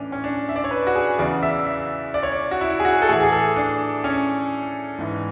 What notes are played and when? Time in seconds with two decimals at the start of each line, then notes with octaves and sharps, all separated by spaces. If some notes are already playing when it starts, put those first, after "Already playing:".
Already playing: A2 E3 C#4 D4
0.12 C#4
0.24 D4
0.49 E5
0.56 D5
0.64 C#5
0.71 B4
0.87 F#4
0.95 G#4
1.18 E2 C#3 E3 D5
1.43 E5
1.67 E5
2.14 D5
2.23 C#5
2.32 D5
2.51 F#4
2.61 E4
2.80 G#4
2.85 F#4
3.02 A4
3.09 A2 E3 G#4
3.24 G#4
3.32 A4
3.56 D4
4.04 C#4
4.99 G#2 E3